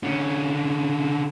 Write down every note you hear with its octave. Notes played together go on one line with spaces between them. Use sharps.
D3 C#4